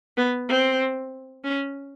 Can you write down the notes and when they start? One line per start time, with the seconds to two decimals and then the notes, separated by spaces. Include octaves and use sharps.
0.17 B3
0.49 C4
1.44 C#4